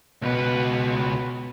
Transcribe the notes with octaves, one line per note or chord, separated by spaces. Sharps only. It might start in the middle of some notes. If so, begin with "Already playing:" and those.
C#2 B2 B4